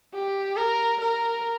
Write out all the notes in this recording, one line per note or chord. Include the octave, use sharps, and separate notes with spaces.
G4
A#4
A#4